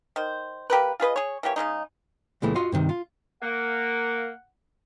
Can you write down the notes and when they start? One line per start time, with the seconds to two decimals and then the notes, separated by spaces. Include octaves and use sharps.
0.16 D#3 C5
0.70 A#3 G4 A#4 B4
1.00 F4 G#4 B4 D#5
1.16 G#4 C#5
1.43 E3 A#3 G4 C#5
1.56 C#3 F3 G#3 D#4
2.42 C#2 A#2 E3 G#3 A3
2.55 F4 F#4 D#5 F5
2.72 G2 C3 D#3
2.89 F4
3.42 A#3 F#5